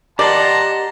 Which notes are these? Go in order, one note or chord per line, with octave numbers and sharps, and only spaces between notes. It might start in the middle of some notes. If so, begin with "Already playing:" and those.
G4 D5 D#5 F#5 A5 A#5 C6